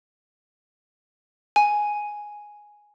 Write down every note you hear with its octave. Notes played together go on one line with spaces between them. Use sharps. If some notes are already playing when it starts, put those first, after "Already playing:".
G#5